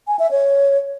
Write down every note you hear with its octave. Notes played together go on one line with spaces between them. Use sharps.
G#5
E5
C#5